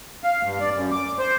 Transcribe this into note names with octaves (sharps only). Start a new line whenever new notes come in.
F5
G2
D5
F#2
D6
C5